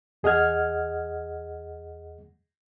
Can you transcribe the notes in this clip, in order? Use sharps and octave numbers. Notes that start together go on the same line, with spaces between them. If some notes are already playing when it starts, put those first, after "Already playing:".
E2 G#4 D#5 F#5 F6 G#6